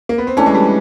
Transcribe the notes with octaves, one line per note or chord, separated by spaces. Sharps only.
A#3
B3
C4
E3 A3 C#4 D4
G#3
G3